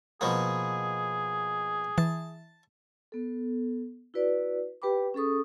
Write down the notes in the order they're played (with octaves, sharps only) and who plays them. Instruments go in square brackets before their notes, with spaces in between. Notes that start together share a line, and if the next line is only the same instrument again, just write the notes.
[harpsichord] B2 F3 A#3 [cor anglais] G#4
[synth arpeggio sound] E3 [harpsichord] A5
[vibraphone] B3 A4
E4 F#4 B4 D5
G4 B4 G5 B5 D6
C#4 G#4 A4 C#6 D#6